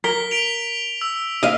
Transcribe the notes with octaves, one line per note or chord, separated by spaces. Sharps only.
A#4 B6 G7
B6 D7 F7
E6
D#5 F5